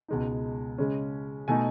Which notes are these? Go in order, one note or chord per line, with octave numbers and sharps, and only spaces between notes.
C#2 B2 G#3 D#4
C#3 G#3 C#4
B2 A3 D#4 G#5